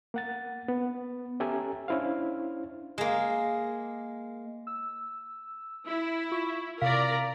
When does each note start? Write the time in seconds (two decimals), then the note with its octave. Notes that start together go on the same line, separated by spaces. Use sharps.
0.14 A#3 F#5 A6
0.68 B3
1.40 C#4 G4 A4 E5 G#5 A#5
1.88 C#4 D4 E4 C5 F5
2.98 G#3 A#3
4.67 E6
5.87 E4
6.32 F4 C#6
6.81 C3 A#4 D5 F5 A#5 B6